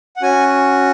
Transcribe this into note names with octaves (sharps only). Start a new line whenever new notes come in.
F#5
C#4 F#4 G#5